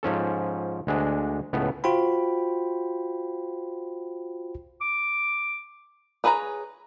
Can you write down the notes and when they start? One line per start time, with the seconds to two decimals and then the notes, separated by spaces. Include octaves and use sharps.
0.03 G#2 F3 C#4 A4
0.87 D2 G#3 D4
1.53 C#2 A2 B3
1.84 F4 F#4 C5 G5 B5
4.81 D6
6.24 D4 G#4 B4 C#5 A#5